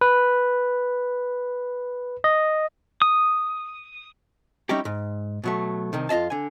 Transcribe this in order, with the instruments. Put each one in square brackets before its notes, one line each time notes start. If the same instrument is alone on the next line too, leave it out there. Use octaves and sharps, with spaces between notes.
[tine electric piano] B4
D#5
[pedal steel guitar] D#6
[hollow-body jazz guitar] G3 C#4 D#4 E4 G4
G#2
B2 F#3 A3
C2 C3 D#3
F2 F4 D#5 E5 A5
D3 G#5